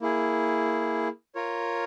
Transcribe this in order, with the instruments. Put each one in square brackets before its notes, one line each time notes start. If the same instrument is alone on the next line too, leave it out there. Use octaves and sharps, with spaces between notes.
[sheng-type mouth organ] A#3 E4 G#4
F4 A#4 C#5